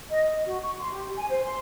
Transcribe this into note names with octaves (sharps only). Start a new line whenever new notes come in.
D#5
D#5
F#4
C#6
C6
G4
G#5
C5
C6